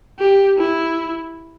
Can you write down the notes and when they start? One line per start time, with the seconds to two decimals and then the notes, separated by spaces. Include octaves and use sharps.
0.19 G4
0.58 E4